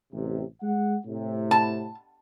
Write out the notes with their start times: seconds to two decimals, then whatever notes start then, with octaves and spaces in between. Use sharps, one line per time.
0.13 A1 C3
0.62 G#3 F#5
1.06 A2 C3
1.51 A5